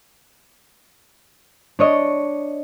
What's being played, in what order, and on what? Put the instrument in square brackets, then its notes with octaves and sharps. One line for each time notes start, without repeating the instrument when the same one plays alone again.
[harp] D4 C#5 D#5